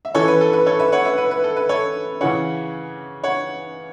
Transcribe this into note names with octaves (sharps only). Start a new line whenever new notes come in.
E5
E3 C#4 A4 C#5
B4
A4
B4
A4 C#5
B4 E5
C#5 F#5
B4 E5
B4
B4
A4
B4
A4 C#5
C#3 E3 C#4 C#5 F#5
C#5 F#5